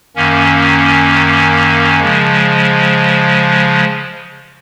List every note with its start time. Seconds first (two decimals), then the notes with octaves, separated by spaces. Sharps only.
0.16 F#2 D#3 A#3 C#4
2.00 C#3 F3 G#3